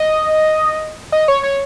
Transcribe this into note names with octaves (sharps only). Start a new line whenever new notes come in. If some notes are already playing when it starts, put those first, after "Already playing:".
Already playing: D#5
D#5
C#5
C#5